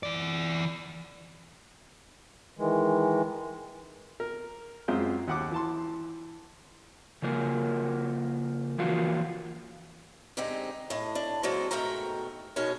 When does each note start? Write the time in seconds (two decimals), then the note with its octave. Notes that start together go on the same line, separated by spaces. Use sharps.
0.03 E3 D5
2.59 D#3 E3 G#3
4.20 A#4
4.88 F#2 G#3 C4 F4
5.28 D#2 F#5 D6
5.52 E3 A5 C6
7.22 C#3 F3 A#3 A#4
8.78 E3 F3 A#3 F4 F#4
10.37 D3 G#3 C4 D#4 G4
10.90 A2 D#5
11.15 D4
11.43 F#3 G#3 A#3 C4 A4 C5
11.71 G#2 B2 A3 A#4 G5 A#5
12.56 B2 G#3 C#4 D#4 A#4 C#5